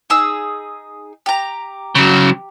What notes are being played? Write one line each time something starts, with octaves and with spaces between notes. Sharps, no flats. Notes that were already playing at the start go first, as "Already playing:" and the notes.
D#4 G#4 E6
G4 A#5
C#3 F#3